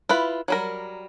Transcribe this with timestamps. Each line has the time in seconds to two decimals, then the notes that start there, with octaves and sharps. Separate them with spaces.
0.09 E4 F4 B4
0.48 F#3 G3 A#4